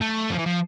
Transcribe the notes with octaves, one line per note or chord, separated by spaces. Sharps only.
A3
F3
E3
F3